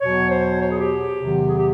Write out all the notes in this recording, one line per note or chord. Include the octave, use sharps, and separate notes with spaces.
E2 B2 F#3 C#5
C5
C#5
G#4
G4
E2 C3 D#3 F#3
G#4
G4